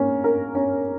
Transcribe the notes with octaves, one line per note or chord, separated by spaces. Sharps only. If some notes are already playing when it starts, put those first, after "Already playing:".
Already playing: A#3 C#4
A#4
C#4